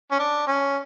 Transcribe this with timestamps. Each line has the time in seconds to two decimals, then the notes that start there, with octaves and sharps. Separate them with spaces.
0.11 C#4
0.19 D4
0.48 C#4